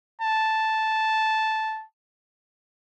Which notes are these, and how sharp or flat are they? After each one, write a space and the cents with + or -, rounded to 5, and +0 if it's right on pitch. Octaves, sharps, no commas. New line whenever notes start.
A5 -5